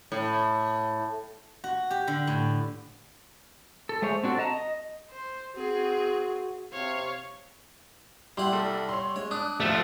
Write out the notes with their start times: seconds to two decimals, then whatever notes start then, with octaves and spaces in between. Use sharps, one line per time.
0.12 A2
1.64 F#4
1.91 G4
2.07 D3
2.27 A2
3.89 A4
4.02 G#3 A3 C5 C#5
4.23 C4 D4 F#4 G#4 A4
4.38 D#5 A5 A#5
4.51 D#5
5.11 C5
5.56 C4 F#4 G#4
6.73 C3 C#5 F5
8.37 G3 E4 F#5 C6 E6
8.52 C2 A4
8.89 C#5 C6
9.16 G#3 C#5
9.31 D4 D#6 F#6
9.60 D2 F3 A3 F#6 B6 E7